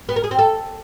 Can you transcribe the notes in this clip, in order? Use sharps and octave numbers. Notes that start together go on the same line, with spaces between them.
B3
A#4
G#4
C4
A4